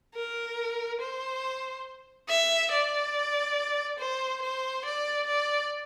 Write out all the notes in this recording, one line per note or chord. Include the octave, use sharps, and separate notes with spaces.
A#4
C5
E5
D5
C5
C5
D5
D5